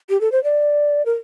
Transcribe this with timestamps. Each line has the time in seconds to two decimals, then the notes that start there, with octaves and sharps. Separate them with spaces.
0.09 G4
0.21 A4
0.32 C5
0.44 D5
1.06 A#4